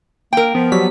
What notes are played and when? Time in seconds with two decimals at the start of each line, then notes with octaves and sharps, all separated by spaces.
0.33 A#3 A#4 G5
0.55 F3 B3
0.72 F#3 G3 B6